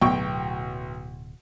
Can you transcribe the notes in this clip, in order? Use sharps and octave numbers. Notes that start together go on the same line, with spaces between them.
D1 B1 B2 A3 G5 C#6